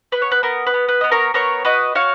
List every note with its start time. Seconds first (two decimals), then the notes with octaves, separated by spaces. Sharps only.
0.12 B3 B4
0.22 C#5
0.31 B4
0.43 B3 A#4
0.67 B4
0.74 B3
0.88 B4
1.01 B3 D#5
1.11 A#4 C#5
1.34 B3 A#4 C#5
1.65 F#4 B4 D#5
1.95 F#4 C#5 F5